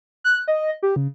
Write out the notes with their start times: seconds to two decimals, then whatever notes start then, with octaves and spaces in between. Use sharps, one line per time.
0.24 F#6
0.48 D#5
0.83 G4
0.96 C#3